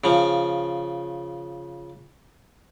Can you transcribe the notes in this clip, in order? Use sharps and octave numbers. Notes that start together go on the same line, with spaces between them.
C#3 F3